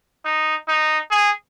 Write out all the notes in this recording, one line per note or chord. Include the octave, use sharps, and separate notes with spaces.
D#4
D#4
G#4